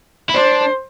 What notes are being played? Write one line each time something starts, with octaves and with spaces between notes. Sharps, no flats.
E4
D4 C5